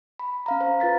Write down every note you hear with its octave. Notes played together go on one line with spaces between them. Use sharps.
B5
C#4 F5 A#5
C5
F4 B4 A6 B6